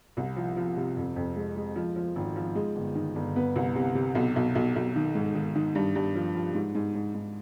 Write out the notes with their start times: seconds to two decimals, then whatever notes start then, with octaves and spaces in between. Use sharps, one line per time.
0.17 C2
0.36 F3
0.57 F3
0.77 C3
0.97 F2
1.16 F2
1.36 G#3
1.57 G#3
1.76 F3
1.96 F3
2.16 G#1
2.36 F3
2.55 G#3
2.75 G1
2.95 D#3
3.16 G1
3.36 B3
3.56 C2
3.76 C3
3.95 C3
4.15 B1
4.36 B1
4.55 B1
4.76 B1
4.96 D#3
5.15 G#2
5.35 D#3
5.55 D#3
5.75 G2
5.95 G2
6.15 F3
6.35 F3
6.55 G#2
6.75 G#2
6.95 G#2
7.15 G#2